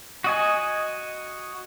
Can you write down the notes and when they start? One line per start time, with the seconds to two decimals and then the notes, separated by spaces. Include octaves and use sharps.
0.24 F#4 D#5 G#5